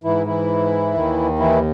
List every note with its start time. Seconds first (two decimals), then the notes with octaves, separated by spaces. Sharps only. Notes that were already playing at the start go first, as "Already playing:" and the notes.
0.04 G#2 E3 E4
0.26 E3 E4
0.94 D#2 D#3
1.39 E3 E4